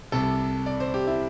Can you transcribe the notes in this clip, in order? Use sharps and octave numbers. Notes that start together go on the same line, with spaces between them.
C2 C3 G3 A4
D5
C5
G4
E4